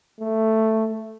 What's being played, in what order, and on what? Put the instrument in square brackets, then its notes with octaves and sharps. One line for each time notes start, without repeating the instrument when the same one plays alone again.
[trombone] A3